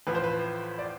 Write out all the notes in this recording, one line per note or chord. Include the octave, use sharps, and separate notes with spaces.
A1 A2 F3 B4
C5
B4
D5